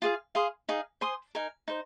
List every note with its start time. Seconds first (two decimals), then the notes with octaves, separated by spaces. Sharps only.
0.02 F4 G#4 F5
0.35 G#4 F5 C6 D#6
0.69 D#4 G#4 F5
1.01 C5 G#5 C6 D#6
1.35 D#4 A#4 G#5
1.68 D#4 C5